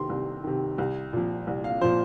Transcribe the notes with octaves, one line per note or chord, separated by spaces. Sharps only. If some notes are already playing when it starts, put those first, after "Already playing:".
Already playing: C3 D#3 C6
C2
C3 D#3
C2
A#2 F3
C2
F5
A#2 F3 C5